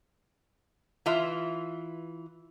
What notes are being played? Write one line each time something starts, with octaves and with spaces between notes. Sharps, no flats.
E3 F4 E5